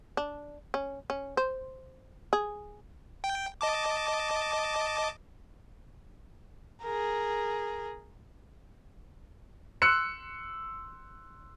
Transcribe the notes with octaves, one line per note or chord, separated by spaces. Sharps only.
D4
C#4
C#4
C5
G#4
G5
D#5 A5 D6
G#4 A#4
C6 E6 F#6 C#7